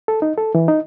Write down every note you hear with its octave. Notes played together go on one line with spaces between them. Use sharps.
A4
D#4
A4
E3
D#4